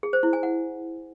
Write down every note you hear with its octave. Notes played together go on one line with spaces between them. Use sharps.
G#4
C5
E4
G#5
F#5